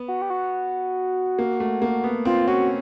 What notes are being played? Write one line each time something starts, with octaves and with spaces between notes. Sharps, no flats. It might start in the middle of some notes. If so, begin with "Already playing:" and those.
Already playing: B3
F#4
G4
F#4
A#3
A3
A#3
B3
C4 F4
C#4 F#4